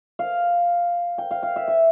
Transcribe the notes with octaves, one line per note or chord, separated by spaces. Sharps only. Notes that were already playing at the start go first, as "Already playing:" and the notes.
F5
G5
F5
F5
E5
E5